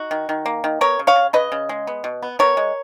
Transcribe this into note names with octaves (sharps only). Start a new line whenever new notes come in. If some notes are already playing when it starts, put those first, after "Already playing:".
Already playing: D#4 F#4
D#3
D#3
A#3
D#3
B3 A#4 C#5
C#3
C#5 F5
C#3
C#3 B4 D#5
C#3
G#3
B3
B2
B3
B3 A#4 C#5
G#3